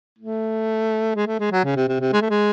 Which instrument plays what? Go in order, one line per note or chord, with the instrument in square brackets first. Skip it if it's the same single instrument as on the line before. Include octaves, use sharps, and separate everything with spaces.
[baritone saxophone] A3
G#3
A3
G#3
F#3
C#3
C3
C3
C3
G#3
A3
G#3